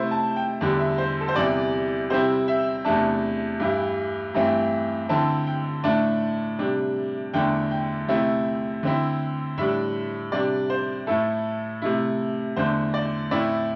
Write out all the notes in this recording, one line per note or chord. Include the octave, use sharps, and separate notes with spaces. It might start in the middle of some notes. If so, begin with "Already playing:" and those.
Already playing: C3 A3 E4 C5
A5
G5
E2 D3 G3 D4
E5
C5
A4
C5
E2 C3 E3 G3 D5
C3 G3 C4 E4 C5
E5
E2 C3 A3 D4 A5
G2 E3 G3 E4
G2 E3 A3 C4
D3 C4 E4 A5
G5
A2 A3 D4 A5
C3 G3 D4
E2 D3 A3 D4 G5
G5
C3 A3 C4 E4
D3 C4 E4
A2 G3 D4 E5
C3 G3 D4 D5
C5
A2 A3 E4 A4
C3 A3 E4
E2 D3 A3 D4 C5
D5
A2 A3 C4 E4 D5